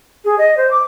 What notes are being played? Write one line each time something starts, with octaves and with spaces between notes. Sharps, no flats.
G#4
D#5
C5
D6